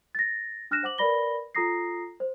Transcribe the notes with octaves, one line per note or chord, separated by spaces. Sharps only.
A6 A#6
D4 F6 F#6 A#6 E7
C5 F#5 D6 F#7
A#4 B4 D5 B5 A#6 G7
F4 A4 A#5 D#6 A#6 C7
C5